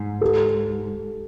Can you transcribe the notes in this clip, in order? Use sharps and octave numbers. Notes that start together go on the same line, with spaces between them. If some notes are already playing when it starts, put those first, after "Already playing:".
Already playing: G#2
G4 A4